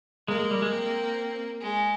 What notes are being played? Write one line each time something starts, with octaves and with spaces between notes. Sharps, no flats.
G#3 A#3
G#3
G3
G#3
C4
G#3